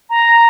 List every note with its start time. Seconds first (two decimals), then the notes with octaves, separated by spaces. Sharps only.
0.10 A#5